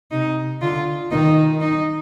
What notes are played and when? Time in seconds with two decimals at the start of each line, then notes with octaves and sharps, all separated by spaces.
0.11 C3 D#4
0.61 D3 F4
1.11 D#3 D#4
1.61 D#4